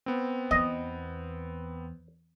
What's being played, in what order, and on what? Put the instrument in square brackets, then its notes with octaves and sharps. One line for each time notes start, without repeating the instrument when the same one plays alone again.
[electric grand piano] B3 C4
[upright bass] E2 [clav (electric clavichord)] D#5